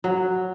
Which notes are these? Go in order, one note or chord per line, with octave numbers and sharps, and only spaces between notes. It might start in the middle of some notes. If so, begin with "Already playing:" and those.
F#3